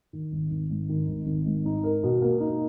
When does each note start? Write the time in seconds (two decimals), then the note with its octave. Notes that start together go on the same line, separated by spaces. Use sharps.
0.13 D#3
0.32 G#1
0.51 G#1
0.70 G#2
0.89 D#3
1.08 G#1
1.27 G#1
1.46 G#2
1.65 D#4
1.84 A#4
2.03 B2
2.22 A#3
2.40 D#4